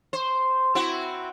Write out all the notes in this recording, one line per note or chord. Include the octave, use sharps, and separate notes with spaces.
C5
C4 E4 F#4